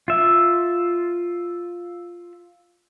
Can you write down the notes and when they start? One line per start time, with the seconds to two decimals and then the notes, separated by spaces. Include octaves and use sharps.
0.08 F4 E5